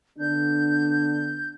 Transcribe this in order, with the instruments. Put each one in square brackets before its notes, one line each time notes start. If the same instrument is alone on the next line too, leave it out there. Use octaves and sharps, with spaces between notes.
[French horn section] D3 B3 D4 [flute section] G6